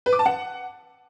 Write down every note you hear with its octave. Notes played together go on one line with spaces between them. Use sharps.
B4
D6
A5
F#5